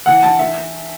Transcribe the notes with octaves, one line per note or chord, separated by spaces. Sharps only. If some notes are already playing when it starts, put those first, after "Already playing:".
E3 F#5
E3 A5
E5